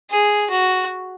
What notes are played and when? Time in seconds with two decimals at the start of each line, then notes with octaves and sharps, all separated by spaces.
0.11 G#4
0.50 F#4